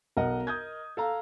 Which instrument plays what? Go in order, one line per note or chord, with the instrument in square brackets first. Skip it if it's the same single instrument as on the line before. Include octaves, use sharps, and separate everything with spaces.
[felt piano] B1 F#5 [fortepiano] A#4 D#5
[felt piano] D#6 G6 G#6
[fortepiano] A4 F5 A#5